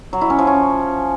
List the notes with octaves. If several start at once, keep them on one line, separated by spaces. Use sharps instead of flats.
F#3
E4
C#4
F3
C#4